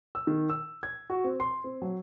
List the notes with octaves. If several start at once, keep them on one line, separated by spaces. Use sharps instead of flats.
E6
D#3
E6
G#6
F#4
C4
C6
C4
F#3